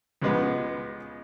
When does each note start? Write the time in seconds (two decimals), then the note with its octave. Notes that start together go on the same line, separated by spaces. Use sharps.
0.22 C#2 C#3 G#3 B3